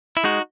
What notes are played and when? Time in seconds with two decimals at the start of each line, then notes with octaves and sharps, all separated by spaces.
0.17 E4
0.24 G#3 D#4 F#4